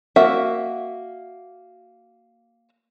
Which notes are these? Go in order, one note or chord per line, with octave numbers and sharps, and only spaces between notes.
A#3 F#4 E5 F#5